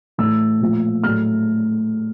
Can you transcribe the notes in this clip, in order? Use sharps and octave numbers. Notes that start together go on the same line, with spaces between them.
A2 E3 A3 E6
A#2 F3 A3
A2 F#3 A3 F6